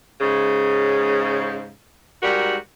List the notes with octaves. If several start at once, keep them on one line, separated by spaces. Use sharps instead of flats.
G#2 C#3
G#2 G3 F#4 A#4